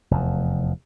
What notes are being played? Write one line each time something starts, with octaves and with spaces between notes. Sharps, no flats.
F1 E2